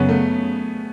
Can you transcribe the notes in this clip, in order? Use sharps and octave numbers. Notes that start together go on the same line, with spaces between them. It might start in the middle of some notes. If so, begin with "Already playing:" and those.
Already playing: F#2 C#3 F#3 B3 C#4 G#4
A3